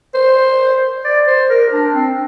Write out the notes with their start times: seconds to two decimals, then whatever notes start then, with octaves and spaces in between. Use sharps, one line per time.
0.14 C5
1.04 D5
1.27 C5
1.50 A#4
1.72 D4
1.93 C4